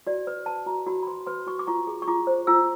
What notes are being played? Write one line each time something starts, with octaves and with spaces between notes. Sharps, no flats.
F#4 D5
B4
B4 A5
F#4 A#5
F#4 B5
B5
B4 C6
B4 C6
F#4 C#6
D6
F4 C#6
G#4
C#6
F4 D6
C5
F4 E6